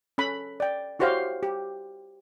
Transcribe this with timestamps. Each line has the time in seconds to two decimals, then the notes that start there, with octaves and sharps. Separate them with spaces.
0.18 C#4 A4 B5
0.60 D5 G5
0.99 E4 F#4 G4 C5 C#5 F5
1.43 G4